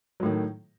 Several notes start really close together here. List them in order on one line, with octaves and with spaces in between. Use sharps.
F#3 A2 D#3